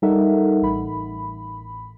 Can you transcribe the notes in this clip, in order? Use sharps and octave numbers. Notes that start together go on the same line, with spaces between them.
G3 D#4 A4 A#4 E5 F#5
A1 B5